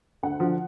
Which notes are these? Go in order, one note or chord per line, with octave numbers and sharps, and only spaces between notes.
D2 F#5
D3 F3